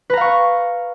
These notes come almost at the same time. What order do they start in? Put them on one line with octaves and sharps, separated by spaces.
B4 A#5 F5 C#6